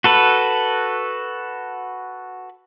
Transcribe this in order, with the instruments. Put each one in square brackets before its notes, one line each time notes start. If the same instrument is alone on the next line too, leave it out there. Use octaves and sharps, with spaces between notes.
[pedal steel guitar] F#4 A4 B4